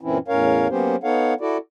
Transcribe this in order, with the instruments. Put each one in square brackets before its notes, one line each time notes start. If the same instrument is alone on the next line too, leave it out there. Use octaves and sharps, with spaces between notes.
[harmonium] F#2 A#2 E3 C4 C#4 E4
E2 A2 C#4 A#4 C#5 F5
F#3 A#3 B3 C#4 G4 C5
B3 D#4 A4 C#5 F5 F#5
E4 F#4 A4 D5